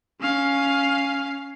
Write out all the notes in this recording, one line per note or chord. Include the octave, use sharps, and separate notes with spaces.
C#4 F5